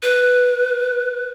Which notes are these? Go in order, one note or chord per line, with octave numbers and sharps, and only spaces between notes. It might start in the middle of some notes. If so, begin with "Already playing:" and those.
B4